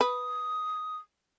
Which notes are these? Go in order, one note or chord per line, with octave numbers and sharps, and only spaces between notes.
B4 D#6